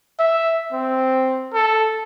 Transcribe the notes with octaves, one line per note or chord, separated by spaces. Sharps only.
E5
C4
A4